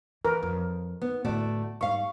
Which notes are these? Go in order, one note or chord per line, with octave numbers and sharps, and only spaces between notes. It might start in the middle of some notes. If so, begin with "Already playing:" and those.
E3 A#4 B4
F2
B3 D#4
D1 A2 A3 E4 F#4 D5
G#2 G3 D#4 F5 C#6